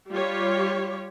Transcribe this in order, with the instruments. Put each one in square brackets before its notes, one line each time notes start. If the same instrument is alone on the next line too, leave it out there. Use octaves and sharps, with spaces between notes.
[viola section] G3 F4 G4 C#5